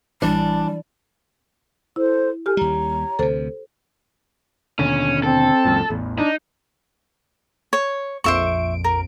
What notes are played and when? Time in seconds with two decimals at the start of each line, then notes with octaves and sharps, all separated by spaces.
0.22 A1 E3 G3 D4
1.96 E4 A4 C5
2.46 G4 A4 G#5 F6
2.57 D#2 G3 C#5 A#5
3.19 D2 C3 A4 C5
4.79 D#2 B2 D3 C#4
5.23 C4 A4
5.65 C#2 F#2 A#2
5.90 A1 E2
6.18 D4 D#4
7.73 C#5
8.24 A#1 F2 C5 E5 C#6 D7
8.84 A#4